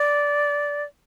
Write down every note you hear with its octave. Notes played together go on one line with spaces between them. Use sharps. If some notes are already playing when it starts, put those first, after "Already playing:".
Already playing: D5